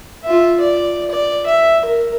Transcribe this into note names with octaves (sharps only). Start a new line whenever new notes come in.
F4 E5
D5
D5
E5
A#4